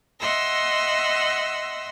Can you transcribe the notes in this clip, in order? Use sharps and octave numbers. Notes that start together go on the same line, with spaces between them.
D#5 E5 F#5 C6 E6 A#6